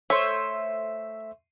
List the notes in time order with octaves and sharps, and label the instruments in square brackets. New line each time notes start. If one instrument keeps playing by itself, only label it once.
[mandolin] A3 C5 [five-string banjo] C#5 [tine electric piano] E5